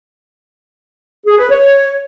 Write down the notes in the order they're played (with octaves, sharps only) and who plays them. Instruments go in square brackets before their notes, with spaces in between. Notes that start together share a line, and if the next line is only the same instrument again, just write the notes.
[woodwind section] G#4
B4
C#5